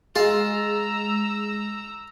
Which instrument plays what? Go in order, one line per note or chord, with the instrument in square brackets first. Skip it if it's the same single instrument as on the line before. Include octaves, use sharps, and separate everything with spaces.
[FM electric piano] G#3 [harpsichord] F4 [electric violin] A#5 E6